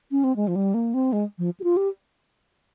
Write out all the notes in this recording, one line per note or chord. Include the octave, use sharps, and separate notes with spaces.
C#4
C4
G#3
F3
G3
A#3
C4
G#3
F3
G4
F4
G4